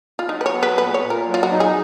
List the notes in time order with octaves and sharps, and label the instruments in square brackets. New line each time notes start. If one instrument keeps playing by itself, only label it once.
[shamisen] F4
[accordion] F#3 [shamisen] D#4
[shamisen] B4
C#5
[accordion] B3
[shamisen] B4
[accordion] A#2 [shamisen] B4
[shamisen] C#5
[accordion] A#2
[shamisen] A#4
[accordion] F#3
[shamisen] F4
F#4
[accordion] D#4
[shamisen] G#4